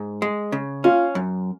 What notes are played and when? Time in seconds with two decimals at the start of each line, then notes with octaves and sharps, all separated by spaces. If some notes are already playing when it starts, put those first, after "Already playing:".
Already playing: G#2
0.22 G#3
0.52 C#3
0.84 C#4 F4
1.15 F#2